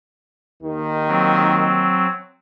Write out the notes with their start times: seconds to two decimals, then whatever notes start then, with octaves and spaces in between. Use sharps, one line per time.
0.63 D#2 D#3
1.08 F#3 C4